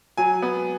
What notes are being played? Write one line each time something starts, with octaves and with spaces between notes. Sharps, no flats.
F#3 G#5
B3